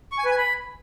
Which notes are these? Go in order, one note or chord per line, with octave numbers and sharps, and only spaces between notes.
C#6
G#5
B4
G#5
B5